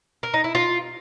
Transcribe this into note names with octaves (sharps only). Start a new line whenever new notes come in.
A#4
D#4
E4
F4